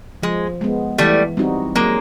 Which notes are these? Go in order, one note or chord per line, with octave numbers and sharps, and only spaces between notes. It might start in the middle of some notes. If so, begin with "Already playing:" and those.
F3 G#3
G#3 B3
E3 G3 A3
G3 C4 D#4 F#4
F#3 G#3 A#3